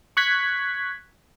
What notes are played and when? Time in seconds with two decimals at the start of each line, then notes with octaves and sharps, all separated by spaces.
0.17 C#6 F#6 G#6 B6